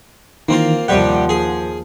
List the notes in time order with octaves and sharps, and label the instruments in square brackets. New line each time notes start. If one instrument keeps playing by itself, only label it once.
[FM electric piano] D#3 E3 [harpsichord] A#3 C4 F4
[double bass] D#2 F3 [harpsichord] C3 G3 G4 [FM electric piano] F#5
[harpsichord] G#4